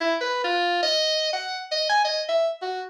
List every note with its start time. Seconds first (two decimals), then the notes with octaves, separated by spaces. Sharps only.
0.01 E4
0.21 B4
0.44 F4
0.83 D#5
1.33 F#5
1.72 D#5
1.89 G#5
2.05 D#5
2.29 E5
2.62 F#4